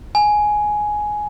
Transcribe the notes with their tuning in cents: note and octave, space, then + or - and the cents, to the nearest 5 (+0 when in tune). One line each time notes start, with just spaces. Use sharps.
G#5 +10